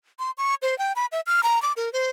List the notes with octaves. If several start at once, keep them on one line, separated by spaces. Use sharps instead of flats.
C6
C#6
C5
G5
B5
E5
F6
A#5
D6
A#4
C5